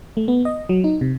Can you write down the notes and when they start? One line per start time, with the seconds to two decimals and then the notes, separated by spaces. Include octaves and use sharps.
0.17 A3
0.28 B3
0.45 D#5
0.69 F#3
0.84 D#4
1.01 C3